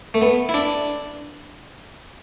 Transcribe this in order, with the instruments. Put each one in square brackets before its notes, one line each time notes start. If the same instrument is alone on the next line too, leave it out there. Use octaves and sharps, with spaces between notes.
[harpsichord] A3
B3
E4
D4